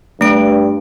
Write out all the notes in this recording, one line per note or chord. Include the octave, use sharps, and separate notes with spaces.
G2 A3 D7